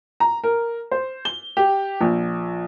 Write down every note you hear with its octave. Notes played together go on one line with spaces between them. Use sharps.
A#5
A#4
C5
G7
G4
A#1